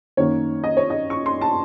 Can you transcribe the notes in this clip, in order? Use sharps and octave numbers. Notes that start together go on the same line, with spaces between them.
F#2 D#3 A#3 C#5
D#5
C#5
D#5
C#6
C6
A5